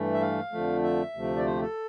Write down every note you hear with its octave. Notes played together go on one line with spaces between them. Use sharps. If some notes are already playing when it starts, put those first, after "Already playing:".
Already playing: G2 E3 A3
E5
F5
F2 D3 F3 A3
E5
D2 C3 F3 A3
D5
C5
G4
A4